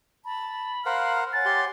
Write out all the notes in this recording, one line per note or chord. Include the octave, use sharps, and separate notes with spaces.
A5 B5
A#4 C5 F5 F#5 F6
C#5 F#5 G#5 A6
G4 C6